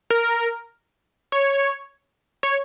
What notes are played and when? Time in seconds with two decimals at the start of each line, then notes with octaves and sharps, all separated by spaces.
0.10 A#4
1.32 C#5
2.43 C#5